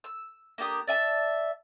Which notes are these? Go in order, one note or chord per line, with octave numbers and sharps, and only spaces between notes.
E6
A#3 D4 G4 D#6
D5 E5 G#5 A5